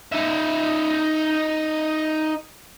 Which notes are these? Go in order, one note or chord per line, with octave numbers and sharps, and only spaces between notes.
D#4 E5